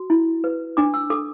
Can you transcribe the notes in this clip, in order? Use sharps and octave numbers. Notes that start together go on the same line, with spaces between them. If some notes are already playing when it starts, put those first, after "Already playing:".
Already playing: F#4
E4
B4
D4 D6
E6
A4 D6